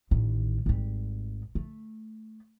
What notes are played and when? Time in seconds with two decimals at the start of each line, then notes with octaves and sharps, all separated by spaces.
0.11 A1 D#3
0.66 G#1 G3
1.55 A3